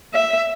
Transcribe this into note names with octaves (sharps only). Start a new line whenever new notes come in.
E5